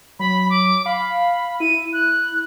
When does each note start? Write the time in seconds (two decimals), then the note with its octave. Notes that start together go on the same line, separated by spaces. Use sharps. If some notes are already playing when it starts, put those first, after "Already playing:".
0.19 F#3 B5
0.50 D6
0.86 F5 B5
1.60 E4 D#7
1.93 F#6